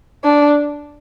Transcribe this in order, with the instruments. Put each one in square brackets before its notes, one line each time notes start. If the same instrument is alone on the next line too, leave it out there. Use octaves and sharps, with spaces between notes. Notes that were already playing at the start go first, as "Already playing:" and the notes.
[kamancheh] D4